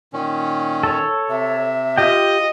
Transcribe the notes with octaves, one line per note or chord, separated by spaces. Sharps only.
A#2 D#3 C#4
A4 C#5
C3 E5
F4 G4 D#5 G5